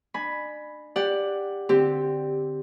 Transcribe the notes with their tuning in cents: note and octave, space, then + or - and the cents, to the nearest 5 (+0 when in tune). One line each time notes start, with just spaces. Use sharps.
D4 +40 G#5 +15 B5 +0
G4 +20 D5 +5 F#5 +5
D3 +0 C4 +0 G4 +5